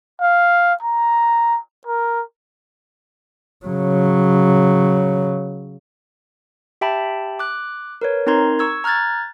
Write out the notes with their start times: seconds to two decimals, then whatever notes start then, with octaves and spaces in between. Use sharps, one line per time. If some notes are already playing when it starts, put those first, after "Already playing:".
0.21 F5
0.82 A#5
1.87 A#4
3.66 C#3 F#3
6.81 G4 E5 G5 A5 B5
7.39 D6 F#6
8.01 A#4 B4 C#5
8.27 C4 D#4 A#4 A#5 C6 G#6
8.59 C#6 E6 G#6
8.84 A#5 F6 F#6 G#6 A6